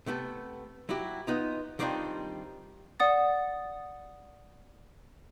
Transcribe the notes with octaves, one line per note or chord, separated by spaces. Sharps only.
C3 A3 B3 A4
F#3 E4 F#4 G4
B3 D#4 F4
D#3 G3 C4 D4 D#4 F4
D5 F#5 D#6 A6